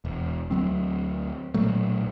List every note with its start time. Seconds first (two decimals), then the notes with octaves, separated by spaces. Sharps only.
0.05 E1
0.51 D2 F#3 C4
1.54 B1 A#2 F#3 A3